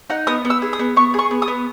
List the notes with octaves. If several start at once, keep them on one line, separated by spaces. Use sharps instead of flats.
D#4 F#5
B3 D#6
B3
E6
G#4
D#6
B3
B3 C#6
G#4 C#6
B3
D#6
B3